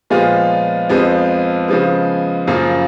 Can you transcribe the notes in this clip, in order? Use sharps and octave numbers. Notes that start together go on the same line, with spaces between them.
A#2 F3 G#3 B3 F4
F2 F3 G#3 B3
C#3 F3 G#3 B3
F#2 C#3 F3 A#3 F4